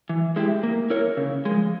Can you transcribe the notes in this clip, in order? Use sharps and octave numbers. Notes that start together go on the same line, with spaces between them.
E3
G#3 E4 G4
A#3
E4 A#4 C#5
C#3
F3 G#3